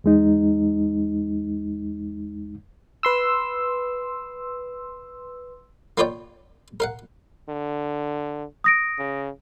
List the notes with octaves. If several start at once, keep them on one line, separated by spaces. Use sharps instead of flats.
E2 G#3 D#4
B4 C6 E6
A#3 B3 F4 C#5 D5 G5
A#4 F5 F#5
D3
D#6 A#6 D7
C#3